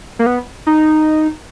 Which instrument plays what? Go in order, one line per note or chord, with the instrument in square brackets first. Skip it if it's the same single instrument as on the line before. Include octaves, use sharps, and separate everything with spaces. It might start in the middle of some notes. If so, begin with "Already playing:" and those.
[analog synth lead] A#3
B3
D#4